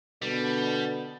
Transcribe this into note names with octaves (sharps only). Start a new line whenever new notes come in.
B2 D3 G3 B3